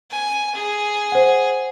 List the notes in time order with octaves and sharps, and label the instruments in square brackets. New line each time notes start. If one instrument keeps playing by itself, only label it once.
[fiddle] G#5
G#4
[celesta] C5 F#5